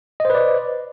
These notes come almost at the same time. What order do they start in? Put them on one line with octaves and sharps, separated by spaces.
D#5 C5 B4 D5